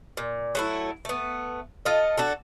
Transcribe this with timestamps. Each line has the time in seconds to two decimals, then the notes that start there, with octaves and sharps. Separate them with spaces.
0.17 A#2
0.55 F#3 A3 E4
1.05 A3 B3
1.85 F4 A4 D#5
2.18 D4 F#4 A4